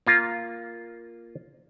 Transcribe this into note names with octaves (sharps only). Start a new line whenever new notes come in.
A#3 F4